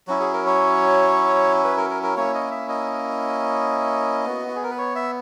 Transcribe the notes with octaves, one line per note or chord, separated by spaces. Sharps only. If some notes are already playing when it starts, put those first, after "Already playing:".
F#3 C#4 E4 F#4
G#4
A#4
C#5
B4
A#4
A#4
A#4
A#3 C#4 E4 C#5
D#5
E5
D#5
B3 F#4
F#4
G#4
A#4
B4
C#5
E5